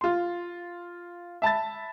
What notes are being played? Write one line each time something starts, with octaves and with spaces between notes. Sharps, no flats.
F4 C6
E5 A5 B5 A6